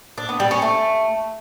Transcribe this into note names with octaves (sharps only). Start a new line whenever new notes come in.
D4
B3
G3
C#4
A3